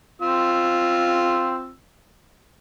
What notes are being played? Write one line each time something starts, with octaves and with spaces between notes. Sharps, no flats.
C4 F4 E6